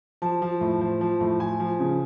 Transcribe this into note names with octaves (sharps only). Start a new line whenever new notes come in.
F3 A5
F3
A2
F3
F3
A2
F3 G#5
F3
C#3